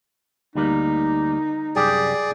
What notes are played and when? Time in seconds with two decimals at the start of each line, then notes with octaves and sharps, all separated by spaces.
0.55 D2 G3 A#3 D#4
1.76 C2 F#2 G4 G#4 D5